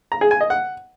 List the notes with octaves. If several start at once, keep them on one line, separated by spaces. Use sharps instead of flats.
A#5
G#4
G#5
D#5
F#5